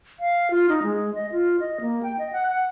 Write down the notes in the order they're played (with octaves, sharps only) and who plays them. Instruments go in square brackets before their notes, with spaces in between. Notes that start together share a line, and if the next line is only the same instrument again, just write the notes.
[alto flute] F5
F4
D#4
G#3
D#5
F4
D#5
A#3
G5
D#5
F#5
F#5